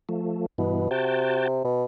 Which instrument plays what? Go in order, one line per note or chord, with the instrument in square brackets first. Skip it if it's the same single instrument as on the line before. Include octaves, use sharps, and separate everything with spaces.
[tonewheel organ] F3 A3
[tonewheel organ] G2 E3 B3 [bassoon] B2
[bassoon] C3 [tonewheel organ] F#4 G5 A5
[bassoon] B2